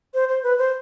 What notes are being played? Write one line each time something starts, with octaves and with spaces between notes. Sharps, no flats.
C5
C5
B4
C5